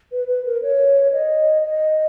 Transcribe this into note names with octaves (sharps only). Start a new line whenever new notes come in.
B4
B4
A#4
C#5
D#5
D#5